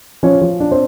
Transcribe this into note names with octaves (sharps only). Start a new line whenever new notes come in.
F3 C#4 C#5
F3
D4
C4 C5